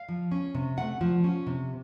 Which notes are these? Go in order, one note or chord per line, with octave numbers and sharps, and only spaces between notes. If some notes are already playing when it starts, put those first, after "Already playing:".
Already playing: F5
F3
C#4
C3
A3 F#5
F3
C#4
C3